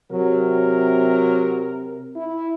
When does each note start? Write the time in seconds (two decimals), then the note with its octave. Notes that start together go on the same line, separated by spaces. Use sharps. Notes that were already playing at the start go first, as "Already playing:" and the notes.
0.12 C3 F#3 A#4
2.16 E4